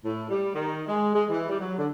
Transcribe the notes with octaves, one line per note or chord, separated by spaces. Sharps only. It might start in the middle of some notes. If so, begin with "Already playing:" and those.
A2
G3
D#3
G#3
G#3
E3
G3
F#3
D3